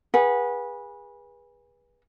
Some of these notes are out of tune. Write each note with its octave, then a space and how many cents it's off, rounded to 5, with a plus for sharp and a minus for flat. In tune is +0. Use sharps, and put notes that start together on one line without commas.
G#4 -25 B4 -25 F#5 -20